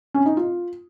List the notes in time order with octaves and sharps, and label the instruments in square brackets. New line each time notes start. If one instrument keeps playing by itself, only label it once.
[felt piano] C#4
D#4
F4